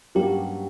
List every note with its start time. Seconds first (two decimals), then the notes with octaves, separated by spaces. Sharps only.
0.15 G2 F#3 A#3 C#4 G4